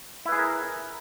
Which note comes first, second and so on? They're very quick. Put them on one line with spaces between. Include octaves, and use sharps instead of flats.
E4 B4 G#4 E5 A#4